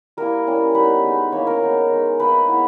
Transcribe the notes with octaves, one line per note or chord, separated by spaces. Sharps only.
G3 A#3 E4 A#4
G3 C#4 E4
G3 B3 D#4 B4
G#3 B3 D#4
A#3 C#4 E4 C#5
A#4
G#3 B3 D#4
G#3 D#4
A#3 D#4 B4
G#3 B3 E4